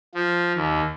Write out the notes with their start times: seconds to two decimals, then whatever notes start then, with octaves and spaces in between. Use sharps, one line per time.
0.15 F3
0.55 D#2